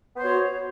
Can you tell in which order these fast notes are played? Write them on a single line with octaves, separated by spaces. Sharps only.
B3 C5 C#5 F#4